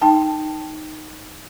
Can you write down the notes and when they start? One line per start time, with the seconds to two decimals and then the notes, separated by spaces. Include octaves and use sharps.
0.02 D#4 G5 A5